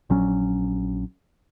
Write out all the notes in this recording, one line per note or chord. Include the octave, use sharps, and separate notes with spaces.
A#1 F#3 C#4